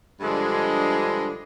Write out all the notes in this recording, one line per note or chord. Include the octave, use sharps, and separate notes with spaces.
G2 D3 F3 G#3 D4